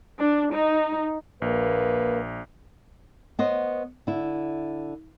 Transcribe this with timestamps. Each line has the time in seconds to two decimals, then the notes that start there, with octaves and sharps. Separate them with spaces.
0.19 D4
0.53 D#4
1.42 A#1 A#3 B4
3.39 B3 C5 C#5 D#5
4.07 D3 E4